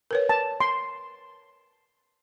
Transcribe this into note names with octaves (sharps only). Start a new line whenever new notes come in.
A#4 B4 C#5
A5
C6